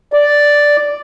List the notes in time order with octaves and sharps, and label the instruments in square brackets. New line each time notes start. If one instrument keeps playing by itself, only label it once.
[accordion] D5